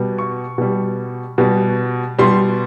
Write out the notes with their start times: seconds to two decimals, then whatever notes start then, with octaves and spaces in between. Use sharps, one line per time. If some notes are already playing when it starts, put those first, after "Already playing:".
Already playing: B2 G3
0.18 C#6
0.58 B2 G3
1.38 B2 G3
2.19 B2 G3 C6